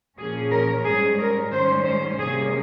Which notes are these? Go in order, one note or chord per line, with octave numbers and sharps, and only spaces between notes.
A#2 F3 A#3 C#4 G#4
A#4
G#2 G3 C#4 G#4
A#4
G#2 D#3 G3 C#4 C5
C5
C3 G3 A#3 C#4 G#4